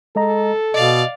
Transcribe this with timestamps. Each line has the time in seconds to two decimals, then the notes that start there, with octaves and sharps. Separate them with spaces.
0.16 G#3 A4 D#5 A#5
0.74 B2 D5 D#5 F5